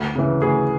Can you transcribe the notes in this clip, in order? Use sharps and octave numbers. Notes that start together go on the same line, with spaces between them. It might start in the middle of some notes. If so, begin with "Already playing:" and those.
Already playing: D2
C#3 E3
D2 G#4